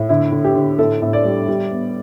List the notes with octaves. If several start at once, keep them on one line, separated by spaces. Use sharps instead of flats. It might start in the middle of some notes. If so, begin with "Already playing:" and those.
Already playing: A2
D3 E4
D3
G4
D3
A2 A4
A2
D5
G3
G3
B3